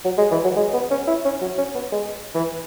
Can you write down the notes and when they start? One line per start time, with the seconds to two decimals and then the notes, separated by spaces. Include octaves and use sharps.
0.05 F#3
0.18 G#3
0.31 E3
0.44 F#3
0.56 G#3
0.73 B3
0.91 C#4
1.08 E4
1.25 C#4
1.41 F#3
1.58 C#4
1.75 B3
1.92 G#3
2.35 E3